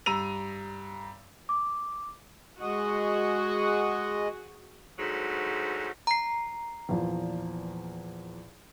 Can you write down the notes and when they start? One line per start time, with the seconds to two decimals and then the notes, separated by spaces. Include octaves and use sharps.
0.06 G2 A#5 E6 D#7 F7
1.49 D6
2.61 G#3 F#4 G#4 D#5
4.99 D2 G#2 F#3
6.07 A#5 C7
6.89 E2 A#2 F3